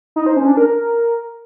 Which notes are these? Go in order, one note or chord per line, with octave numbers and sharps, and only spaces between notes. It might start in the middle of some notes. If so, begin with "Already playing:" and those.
D#4
C5
C#4
D4
A#4